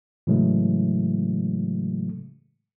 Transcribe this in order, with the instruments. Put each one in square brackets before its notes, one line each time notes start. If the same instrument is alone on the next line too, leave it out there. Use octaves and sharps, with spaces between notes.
[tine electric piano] A2 C#3 E3 F#3 G#3 A3